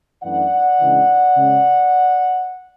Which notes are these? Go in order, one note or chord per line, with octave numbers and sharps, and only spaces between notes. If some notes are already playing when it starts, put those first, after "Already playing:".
F#2 E3 A3 D4 D5 F#5
C#3 E3 G#3 D4
C#3 G#3 C#4